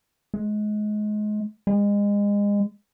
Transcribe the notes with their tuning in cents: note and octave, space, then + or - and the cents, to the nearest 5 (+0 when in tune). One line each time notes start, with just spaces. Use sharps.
G#3 +25
G#3 -30